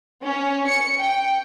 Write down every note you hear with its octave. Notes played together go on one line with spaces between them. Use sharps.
C#4
C#7
G5